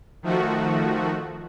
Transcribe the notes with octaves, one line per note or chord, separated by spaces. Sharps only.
D#3 F3 A3 F#4